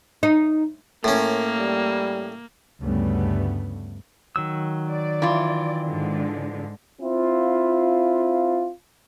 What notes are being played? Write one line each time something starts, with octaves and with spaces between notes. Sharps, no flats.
D#4
A2 A#3 C#4 A#4
G3
D2 G2 C#3 G3 A3 B3
D#3 F#3 E6
D5
E3 F4
G#2 D3 G#3
C4 E4 F4